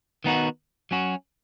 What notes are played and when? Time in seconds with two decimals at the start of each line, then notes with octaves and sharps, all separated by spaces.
0.24 D#3 B3 D#4 F#4
0.91 F#3 C#4 F#4